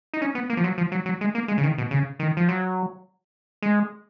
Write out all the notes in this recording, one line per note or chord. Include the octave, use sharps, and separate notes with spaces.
D#4
C#4
B3
A#3
F3
F#3
F3
F#3
F#3
G#3
A#3
G#3
C#3
D#3
B2
C#3
D#3
F3
F#3
G#3